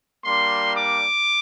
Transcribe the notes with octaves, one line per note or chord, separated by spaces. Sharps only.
G3 A#3 D4 C6
D6